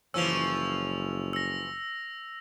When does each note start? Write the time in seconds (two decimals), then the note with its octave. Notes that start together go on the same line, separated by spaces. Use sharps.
0.14 F#1 E3 F3 C#4 E6 F7
1.33 E6 A#6